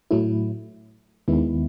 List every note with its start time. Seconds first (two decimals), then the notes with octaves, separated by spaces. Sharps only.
0.11 A2 F#3 A3 E4
1.28 D#2 D#3 G#3 B3 E4